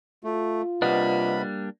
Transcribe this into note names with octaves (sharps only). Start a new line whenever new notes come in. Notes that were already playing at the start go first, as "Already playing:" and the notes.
A3 F4
C3 G3 A#3 D4 B4 D#5 F#5 B5